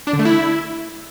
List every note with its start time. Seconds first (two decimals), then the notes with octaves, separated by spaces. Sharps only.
0.07 D4
0.13 D3
0.19 A3
0.25 E4